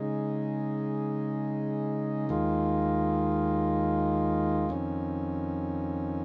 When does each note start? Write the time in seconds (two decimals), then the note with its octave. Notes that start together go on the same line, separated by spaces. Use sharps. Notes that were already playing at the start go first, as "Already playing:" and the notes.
Already playing: C#3 G#3 D#4
2.29 D#2 D#3 G#3 F4
4.69 F2 D#3 C#4